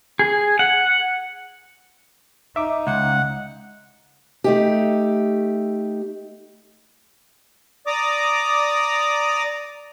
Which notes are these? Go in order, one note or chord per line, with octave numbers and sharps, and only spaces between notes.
G#4
F#5
D#4 E5 D6
C#2 F#5
A3 D#4 G4
D5 A#5 D6 D#6